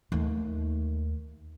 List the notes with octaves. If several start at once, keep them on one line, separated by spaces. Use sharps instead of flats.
D#2 A3